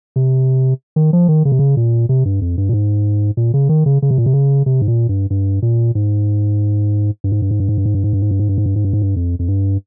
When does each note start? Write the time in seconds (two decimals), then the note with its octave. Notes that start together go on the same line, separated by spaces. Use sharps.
0.16 C3
0.96 D#3
1.13 F3
1.28 D#3
1.45 C#3
1.52 C3
1.59 C#3
1.77 A#2
2.09 C3
2.25 G2
2.41 F2
2.58 G2
2.69 A#2
2.73 G#2
3.37 A#2
3.54 C#3
3.69 D#3
3.86 C#3
4.02 C#3
4.11 C3
4.18 A#2
4.26 C3
4.34 C#3
4.66 C3
4.82 G#2
4.88 A#2
5.09 G2
5.30 G2
5.62 A#2
5.95 G#2
7.24 G2
7.32 G#2
7.42 G2
7.51 G#2
7.60 G2
7.69 G#2
7.78 G2
7.85 G#2
7.94 G2
8.04 G#2
8.13 G2
8.22 G#2
8.31 G2
8.39 G#2
8.49 G2
8.58 G#2
8.66 G2
8.76 G#2
8.85 G2
8.93 G#2
9.02 G2
9.16 F2
9.39 F2
9.48 G2